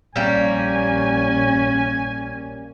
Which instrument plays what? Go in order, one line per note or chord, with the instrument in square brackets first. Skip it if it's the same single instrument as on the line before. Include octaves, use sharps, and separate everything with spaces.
[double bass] A#1 C#4 [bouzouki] G3 A#3 [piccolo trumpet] G#5